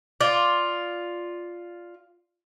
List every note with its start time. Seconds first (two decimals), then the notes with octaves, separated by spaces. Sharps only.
0.21 F4 D5